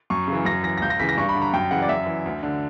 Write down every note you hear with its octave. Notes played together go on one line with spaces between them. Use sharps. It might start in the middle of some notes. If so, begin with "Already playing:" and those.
F#2 C#6
C#3
E3
F#2 A#6
E3 A#6
A#6
C#2 G6
A#6
C#3 E3 B6
A#6
G2 C#6
B5
D3
A#5
F#2 G5
C#3 E3 F#5
D5
F#2 E5
E3
D2
D3